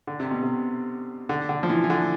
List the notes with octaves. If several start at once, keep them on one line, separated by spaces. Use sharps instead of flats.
D3
C3
B2
C3
D3
D3
F3
E3
E3
D3